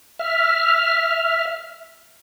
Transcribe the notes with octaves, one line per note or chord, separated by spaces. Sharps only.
E5 F6